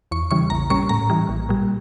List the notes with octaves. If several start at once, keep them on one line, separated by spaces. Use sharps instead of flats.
E2 C#6
C#3 E3 G3 C#6
A#1 A#5
A#2 G3 C#4 C#6
A2 A#5
E3 G3
A#1
A#2 G3